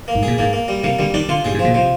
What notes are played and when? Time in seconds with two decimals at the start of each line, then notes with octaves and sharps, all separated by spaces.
0.08 A#3
0.15 G#2
0.23 A#2 G#4
0.38 G#2 A#3
0.53 A#3
0.68 G3
0.83 C3 A#3
0.99 D3 G3
1.14 D#3 D4
1.29 D3 F4
1.44 G2 G#4
1.54 G#2
1.59 F3
1.64 A#2
1.74 C3 F3